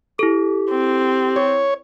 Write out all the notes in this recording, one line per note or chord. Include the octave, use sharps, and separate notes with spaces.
E4 G4 A4
C4
C#5